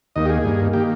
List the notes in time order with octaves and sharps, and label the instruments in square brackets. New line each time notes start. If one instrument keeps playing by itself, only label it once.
[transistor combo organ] D#2 D#3 A#3 D#5
G4
G#4
G2 D#3 A#3
D#3 A#3 G4